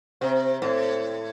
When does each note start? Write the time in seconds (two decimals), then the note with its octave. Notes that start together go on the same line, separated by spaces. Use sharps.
0.21 C3 C4
0.62 A2 C4